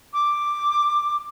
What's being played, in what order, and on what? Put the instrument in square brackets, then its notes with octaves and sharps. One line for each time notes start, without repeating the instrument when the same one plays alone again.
[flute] D6